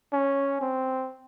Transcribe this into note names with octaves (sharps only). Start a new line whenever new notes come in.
C#4
C4